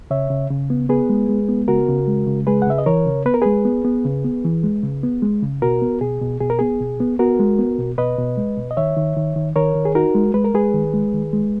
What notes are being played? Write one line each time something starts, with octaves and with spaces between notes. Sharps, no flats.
C#3 C#5 E5
C#3
C#3
B3
B3 G#4 B4
G#3
G#3
B3
C#3 F#4 A#4
C#3
G#3
C#3
G#3 G#4 B4
F#5
C#3 E5
D#5
E3 A#4 C#5
C#3
B3 B4
A#4
G#3 G#4 B4
B3
B3
C#3
B3
E3
G#3
C#3
B3
G#3
C#3
B2 F#4 A#4
B3
B2 G#4
B2
B2 G#4
A#4
B3 G#4
B2
B3
B3 F#4 A#4
G#3
B3
B2
B2 B4 D#5
B2
G#3
B2
D#5
D#3 C#5 E5
D#3
D#3
D#3
D#3 A#4 C#5
D#3
G#4
D#4 F#4 A#4
G#3
G#3 B4
A#4
G#3 G#4 B4
D#3
G#3
D#3
G#3